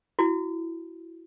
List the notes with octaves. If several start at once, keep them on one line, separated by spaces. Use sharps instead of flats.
E4 F#4